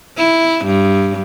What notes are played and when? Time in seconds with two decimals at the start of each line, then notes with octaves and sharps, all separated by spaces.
0.17 E4
0.65 G2